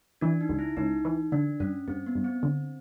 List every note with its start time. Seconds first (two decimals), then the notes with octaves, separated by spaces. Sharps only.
0.21 E3 D4
0.41 D#4
0.49 C#2
0.59 E4
0.77 C#2 D#4
1.05 E3
1.32 D3 D4
1.60 G2 C#4
1.88 G2 C4
2.06 B3
2.15 G2
2.24 C4
2.43 D3